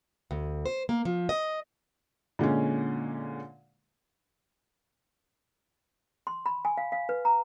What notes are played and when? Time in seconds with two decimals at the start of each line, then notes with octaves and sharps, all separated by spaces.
0.31 D2
0.66 C5
0.89 A#3
1.05 F3
1.29 D#5
2.39 A#2 D3 G#3 C#4
6.27 C6
6.46 B5
6.65 G#5
6.78 F5
6.92 F5
7.09 B4
7.25 A#5